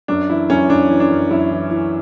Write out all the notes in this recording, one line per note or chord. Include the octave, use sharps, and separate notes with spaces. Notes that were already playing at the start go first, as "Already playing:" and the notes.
F#2 D4
E3 E4
F#2 C#4
F#2 D4
E3
D4
F#2
F#2 E4
E3
E3